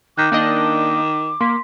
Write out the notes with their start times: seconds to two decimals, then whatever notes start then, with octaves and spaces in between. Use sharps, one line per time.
0.18 D#3 D6 F#6 G6
0.32 D#3 A#3 D4 D#5
1.41 A#3 C6 B6